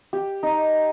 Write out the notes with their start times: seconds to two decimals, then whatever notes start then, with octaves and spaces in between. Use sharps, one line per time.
0.13 G4
0.43 D#4